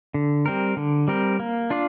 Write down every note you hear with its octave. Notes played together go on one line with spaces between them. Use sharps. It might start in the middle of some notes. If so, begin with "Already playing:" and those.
D3
G3 C4 A#4
D3
G3 C4 A#4
A#3
D4 F4 D5